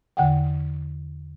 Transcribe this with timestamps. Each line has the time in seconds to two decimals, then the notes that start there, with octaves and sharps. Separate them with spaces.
0.17 E2 D3 F#5 G5